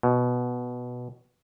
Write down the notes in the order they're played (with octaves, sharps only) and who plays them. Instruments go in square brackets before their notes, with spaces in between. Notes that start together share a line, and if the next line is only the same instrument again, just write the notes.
[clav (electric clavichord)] B2